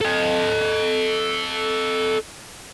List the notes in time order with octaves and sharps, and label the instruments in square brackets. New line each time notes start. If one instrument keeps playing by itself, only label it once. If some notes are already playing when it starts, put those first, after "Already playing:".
[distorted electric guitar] A4 D#5